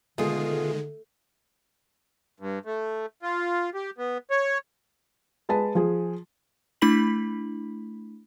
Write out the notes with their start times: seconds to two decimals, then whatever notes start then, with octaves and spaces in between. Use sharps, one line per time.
0.18 B2 D3 D#3 G#3 A3 F4 G#4
2.40 G2
2.65 A3
3.23 F4
3.74 G4
3.98 B3
4.30 C#5
5.49 G#3 B4 A5
5.75 F3 G#4
6.82 A3 D4 E4 B5 B6 F#7